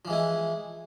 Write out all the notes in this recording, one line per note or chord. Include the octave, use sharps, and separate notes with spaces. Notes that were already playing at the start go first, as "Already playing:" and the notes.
E3 F3 G#3 E4